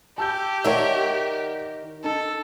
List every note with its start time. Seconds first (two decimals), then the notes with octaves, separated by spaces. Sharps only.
0.18 G4 A5 E6 G6
0.64 D#3 A#4 C#5 D5 E5 F#5
2.04 D#4 A4